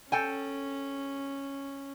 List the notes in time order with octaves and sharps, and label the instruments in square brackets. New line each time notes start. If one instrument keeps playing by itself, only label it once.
[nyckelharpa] C#4 [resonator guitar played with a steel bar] A4 G5 G#5